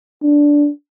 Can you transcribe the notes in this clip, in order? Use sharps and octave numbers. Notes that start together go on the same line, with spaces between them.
D4